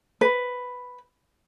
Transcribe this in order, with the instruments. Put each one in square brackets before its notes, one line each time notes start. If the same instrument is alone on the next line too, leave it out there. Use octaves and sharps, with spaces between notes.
[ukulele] B4